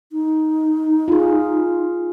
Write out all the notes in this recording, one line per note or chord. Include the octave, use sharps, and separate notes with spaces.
D#4
F4 G#4